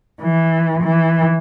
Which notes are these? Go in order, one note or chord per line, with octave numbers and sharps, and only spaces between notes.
E3
E3